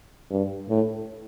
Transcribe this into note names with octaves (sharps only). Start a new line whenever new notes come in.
G2
A2